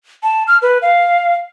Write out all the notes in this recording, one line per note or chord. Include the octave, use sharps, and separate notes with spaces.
A5
F6
B4
F5